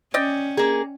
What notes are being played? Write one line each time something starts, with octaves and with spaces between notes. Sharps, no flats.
C#4 D5 D#5 G5
A#3 G#4